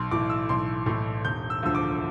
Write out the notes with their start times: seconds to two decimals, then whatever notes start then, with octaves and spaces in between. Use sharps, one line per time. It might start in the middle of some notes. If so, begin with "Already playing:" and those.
Already playing: B1 C6
0.11 A2 E3 D6
0.30 E6
0.49 B1 C6
0.86 A2 E3
1.25 E1 G6
1.50 E6
1.63 D2 D3 F3 E6
1.75 D6